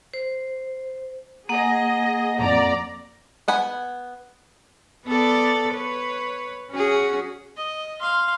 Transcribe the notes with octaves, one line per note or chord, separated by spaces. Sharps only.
C5
A#3 G#4 D#5 F#5
F2 D5 A#5
B3 F#5 G#5 B5
B3 A4 D5
B4 C#5
C#4 F#4 G#4
D#5
F5 C6